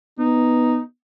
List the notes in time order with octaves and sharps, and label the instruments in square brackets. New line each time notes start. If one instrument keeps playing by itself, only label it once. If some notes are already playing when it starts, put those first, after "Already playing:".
[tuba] B3 [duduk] D#4